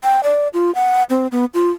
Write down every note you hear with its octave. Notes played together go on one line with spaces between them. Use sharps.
G5
D5
F4
F#5
C4
B3
F4